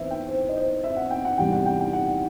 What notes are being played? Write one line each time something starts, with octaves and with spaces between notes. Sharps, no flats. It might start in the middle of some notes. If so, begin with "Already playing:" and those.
Already playing: E2 B4 C5 E5
G5
C5
D#5
C5
E5
F#5
G5
F#5
E2 C3 E3 G3 G5
F#5
G5
G5
F#5